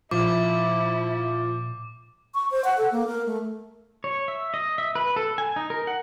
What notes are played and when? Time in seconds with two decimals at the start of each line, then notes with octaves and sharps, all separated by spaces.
0.11 A#2 F3 E4 D6
2.34 C#6
2.51 C5
2.64 F#5
2.78 A4
2.92 A#3
3.07 A#4
3.26 A3
4.04 C#5
4.28 E5
4.54 D#5
4.78 E5
4.95 B4
5.16 A4
5.38 G#5
5.56 D#4
5.70 A#4
5.87 F#5